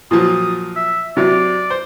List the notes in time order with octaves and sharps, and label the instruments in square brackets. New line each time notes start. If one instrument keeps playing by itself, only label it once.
[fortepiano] A#2 F3 F#3 [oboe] D#6
[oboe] E5
[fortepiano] C3 F#3 [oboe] D5
[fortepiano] C5